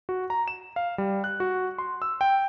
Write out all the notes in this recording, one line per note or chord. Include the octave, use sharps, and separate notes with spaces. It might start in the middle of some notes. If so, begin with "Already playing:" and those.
F#4
A#5
E7
F5
G3
F#6
F#4
C6
E6
G5